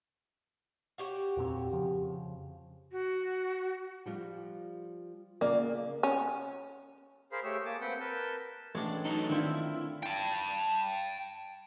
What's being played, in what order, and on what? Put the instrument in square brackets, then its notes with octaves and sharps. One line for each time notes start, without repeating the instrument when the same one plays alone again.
[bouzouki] F#4 G4 C#5
[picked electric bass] E2 A#2 C4
F2 C#3 F3
[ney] F#4
[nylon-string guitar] F3 G3 F4
[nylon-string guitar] C#3 B3 F4 [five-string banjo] A#3 [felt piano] D5
[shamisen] C#4
[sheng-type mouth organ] G#4 A#4 C5 F5 B5
A3 G4 G#4 C#5 E6
A#3 G#5 A5 D6
C4 B4 F#5 G5
A#4 B4 A5 G6
[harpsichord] A1 D4 [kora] G#3 C#5
[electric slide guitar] F#3 A4 [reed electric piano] D#4
[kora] D3 C4 F4 [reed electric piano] D#3 [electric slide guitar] E4
[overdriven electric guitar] G5 A5